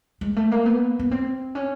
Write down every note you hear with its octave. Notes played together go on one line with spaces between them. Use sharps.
G#3
A3
A#3
B3
B3
C4
C#4